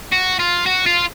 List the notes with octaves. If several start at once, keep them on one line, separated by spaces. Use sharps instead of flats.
F#4
F4
F#4
F4